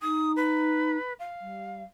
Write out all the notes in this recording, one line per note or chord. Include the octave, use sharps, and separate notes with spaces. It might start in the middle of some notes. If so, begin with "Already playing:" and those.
D#4 D#6
B4
F5
G3